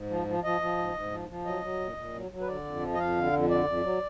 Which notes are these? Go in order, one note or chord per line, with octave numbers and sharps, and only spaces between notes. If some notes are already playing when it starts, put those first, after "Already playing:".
Already playing: G#2
F3
F3
F3 D#5
F3
G#2
G#2
F3
F3
F#3 D#5
F#3
A#2
A#2
F#3
F#3
B4
D3 D5
F2
F3
D#5
F2 F5
D3
F2
D3 D5
F2
F#3